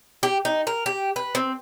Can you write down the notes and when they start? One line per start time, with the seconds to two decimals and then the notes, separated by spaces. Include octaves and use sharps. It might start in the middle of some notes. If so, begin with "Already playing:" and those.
0.23 G4
0.45 D#4
0.67 A#4
0.86 G4
1.16 B4
1.35 C4